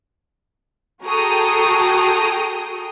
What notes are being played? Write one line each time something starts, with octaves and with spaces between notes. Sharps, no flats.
F#4 G#4 A4 G5 A#5 D#6